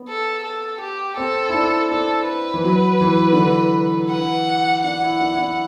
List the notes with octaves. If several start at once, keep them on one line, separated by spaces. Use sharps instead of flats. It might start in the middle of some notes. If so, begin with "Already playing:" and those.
Already playing: B3
A4
A4
G4
C4 A4
E4
D4
D4 A4
B4
E3
F#3
E3
D3
E3
F#5
D4 F#5
E4
D4
E4
D4